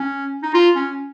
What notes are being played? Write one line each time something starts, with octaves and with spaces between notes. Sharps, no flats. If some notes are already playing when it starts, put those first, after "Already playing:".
Already playing: C#4
D#4
F4
C#4